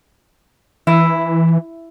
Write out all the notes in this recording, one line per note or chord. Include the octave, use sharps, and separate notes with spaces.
E3 E4